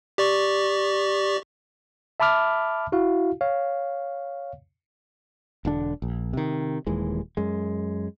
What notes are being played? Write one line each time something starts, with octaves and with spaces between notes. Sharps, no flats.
G4 D5 C#6
E5 A5 B5 D6 F6
E4 F#4 F5
C#5 F5
E1 D3 D4
A#1
C3 D#3
D#1 D#2 E3 G#3
F#2 G#3